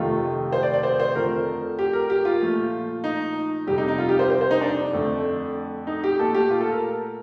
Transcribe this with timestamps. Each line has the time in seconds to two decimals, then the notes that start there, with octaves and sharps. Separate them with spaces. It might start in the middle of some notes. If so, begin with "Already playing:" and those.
Already playing: F2 C3 D#3 A3 F4
0.53 C5
0.63 D5
0.74 D5
0.83 C5
1.00 C5
1.15 F2 D3 F3 A3 A#4
1.79 G4
1.93 A#4
2.10 G4
2.25 F4
2.41 A#2 F3 A3
3.04 D#4
3.67 F2 C3 G3 G4
3.78 D#4
3.88 D#4
3.98 F4
4.09 G4
4.19 C5
4.30 C5
4.41 C5
4.51 D#4
4.61 D4
4.93 F2 D3 A3
5.87 D#4
6.04 G4
6.19 A#2 A3 A4
6.34 G4
6.50 F4
6.61 A4
6.71 A#4